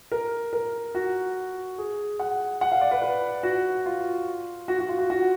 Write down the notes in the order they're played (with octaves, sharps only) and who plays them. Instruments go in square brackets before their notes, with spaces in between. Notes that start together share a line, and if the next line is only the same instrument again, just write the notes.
[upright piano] A#4
A#4
F#4
G#4
F#5
F#5
F5
D5
B4
B4
F#4
F4
F#4
F#4
F4
F#4
F#4